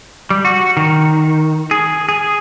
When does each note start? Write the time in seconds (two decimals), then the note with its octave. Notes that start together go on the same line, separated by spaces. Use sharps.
0.30 G3
0.45 F#4
0.77 D#3
1.71 G#4
2.09 G#4